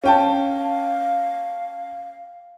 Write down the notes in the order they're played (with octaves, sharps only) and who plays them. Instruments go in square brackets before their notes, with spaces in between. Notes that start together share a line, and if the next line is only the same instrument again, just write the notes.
[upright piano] C#4 G5 A5 [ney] F5